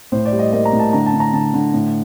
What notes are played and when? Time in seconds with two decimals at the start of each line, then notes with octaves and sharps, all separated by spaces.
0.12 A2 C5
0.25 D5
0.32 G3
0.39 D#5
0.52 A#3 D#5
0.65 A#5
0.73 A2
0.79 A5
0.93 D3 A#5
1.06 A5
1.13 D3
1.20 A#5
1.33 D3 A5
1.54 D3
1.73 A2